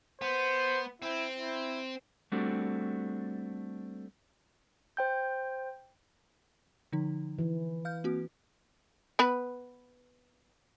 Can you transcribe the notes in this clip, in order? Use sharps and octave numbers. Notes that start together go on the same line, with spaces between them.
B3 C5
C4 E4
E4
G3 A3 C4 D4 F#4
C5 G5 G6
D3 F3 D#4
E3
F5 F6 G6
A#3 C4 F#4
B3 B4